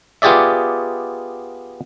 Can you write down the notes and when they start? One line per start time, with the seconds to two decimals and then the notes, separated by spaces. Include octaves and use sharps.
0.22 B3 F4 G4 G#4 D5 E5